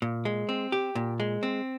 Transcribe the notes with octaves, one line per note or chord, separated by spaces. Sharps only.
A#2
G#3
C4
G4
A#2
G#3
C4